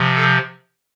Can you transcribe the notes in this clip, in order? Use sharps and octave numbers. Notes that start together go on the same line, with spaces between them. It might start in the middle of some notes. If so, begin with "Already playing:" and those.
Already playing: C3 F3
A4